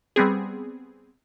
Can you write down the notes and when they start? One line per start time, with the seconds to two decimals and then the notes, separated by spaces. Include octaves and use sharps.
0.16 G3 B3 C4 G#4